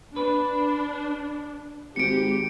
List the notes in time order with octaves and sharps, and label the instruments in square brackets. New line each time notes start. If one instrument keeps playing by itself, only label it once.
[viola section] D4 [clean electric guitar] B4
[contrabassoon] G#1 [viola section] G4 [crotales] C#7 D7